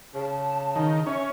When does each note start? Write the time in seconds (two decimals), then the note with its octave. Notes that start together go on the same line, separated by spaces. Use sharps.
0.15 C#3 A5
0.76 D#3
1.07 C#4 E5